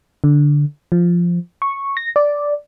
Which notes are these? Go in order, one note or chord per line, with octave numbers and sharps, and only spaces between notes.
D3
F3
C#6
A#6
D5